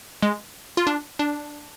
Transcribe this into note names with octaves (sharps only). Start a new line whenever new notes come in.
G#3
F4
D4
D4